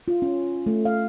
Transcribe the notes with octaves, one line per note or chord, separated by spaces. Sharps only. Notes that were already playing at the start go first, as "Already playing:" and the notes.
F4
C#4
A3
F5